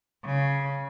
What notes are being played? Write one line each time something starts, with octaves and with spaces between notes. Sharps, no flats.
C#3